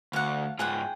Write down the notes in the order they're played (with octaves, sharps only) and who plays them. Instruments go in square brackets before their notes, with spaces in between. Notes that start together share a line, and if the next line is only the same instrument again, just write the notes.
[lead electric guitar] D2 [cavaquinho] F5 F#5
[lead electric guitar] G#2 F4 [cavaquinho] G#4 F#5 G5